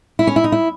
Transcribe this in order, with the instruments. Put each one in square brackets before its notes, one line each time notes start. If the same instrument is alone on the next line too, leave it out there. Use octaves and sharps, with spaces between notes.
[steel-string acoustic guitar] E4
C#4
E4
D#4
E4